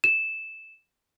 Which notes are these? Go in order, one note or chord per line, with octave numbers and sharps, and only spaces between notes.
E7